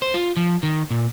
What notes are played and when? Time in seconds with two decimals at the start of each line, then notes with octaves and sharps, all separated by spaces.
0.02 C5
0.14 F4
0.37 F3
0.63 D#3
0.90 A#2